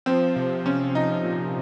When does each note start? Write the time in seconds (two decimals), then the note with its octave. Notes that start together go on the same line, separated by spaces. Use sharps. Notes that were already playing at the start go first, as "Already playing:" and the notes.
0.06 F3 C4
0.36 C3
0.65 F3 C#4
0.95 C3 D#4
1.24 A#2